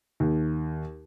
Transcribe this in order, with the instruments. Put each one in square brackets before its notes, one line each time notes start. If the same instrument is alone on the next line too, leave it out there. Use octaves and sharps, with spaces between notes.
[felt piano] D#2